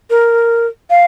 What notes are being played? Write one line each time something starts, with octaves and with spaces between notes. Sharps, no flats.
A#4
F5